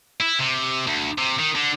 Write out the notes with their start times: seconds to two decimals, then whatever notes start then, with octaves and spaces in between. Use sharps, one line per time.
0.21 E4
0.39 C3
0.87 D2
1.18 C3
1.39 D#3
1.55 D3